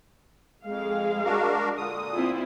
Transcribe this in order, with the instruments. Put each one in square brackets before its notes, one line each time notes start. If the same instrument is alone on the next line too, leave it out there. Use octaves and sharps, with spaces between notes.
[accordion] F2 [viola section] G#3 F5
[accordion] D4 F#4 A#4
A#2 D3 D#6
[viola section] C4 E4 F4